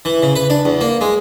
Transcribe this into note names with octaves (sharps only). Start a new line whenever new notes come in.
E3
C#3
B4
D4
E2
A#3
G#3